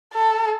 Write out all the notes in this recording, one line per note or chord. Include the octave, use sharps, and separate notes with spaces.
A4